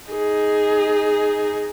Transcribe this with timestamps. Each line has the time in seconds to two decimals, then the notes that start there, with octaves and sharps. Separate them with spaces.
0.10 D#4 G#4